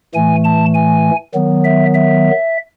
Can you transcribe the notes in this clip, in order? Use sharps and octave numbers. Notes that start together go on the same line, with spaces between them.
A2 E3 A3 G#5
A5
G#5
D#3 F#3 B3
E5
E5